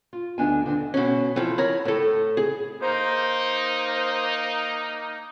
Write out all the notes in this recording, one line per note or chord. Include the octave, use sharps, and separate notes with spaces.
F4
D2 B3 D4 D#4 F4 G#5
D3 C4 D4
B2 C#4
E3 F3
A#4 C#5 B5
A2 A4
G#4
A#3 D#4 C5